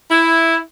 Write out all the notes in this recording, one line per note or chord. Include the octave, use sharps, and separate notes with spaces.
E4